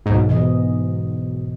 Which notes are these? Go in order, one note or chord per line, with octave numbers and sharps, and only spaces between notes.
B1 G#2
B2 E3 D#5